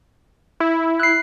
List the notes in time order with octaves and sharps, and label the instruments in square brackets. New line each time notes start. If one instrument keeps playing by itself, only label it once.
[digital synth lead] E4
[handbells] F#6 C7